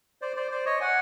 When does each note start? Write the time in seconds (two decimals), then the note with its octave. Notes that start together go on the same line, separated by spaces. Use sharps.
0.22 C5 D5
0.36 C5 D5
0.51 C5 D5
0.66 C#5 D#5
0.81 F#5 G#5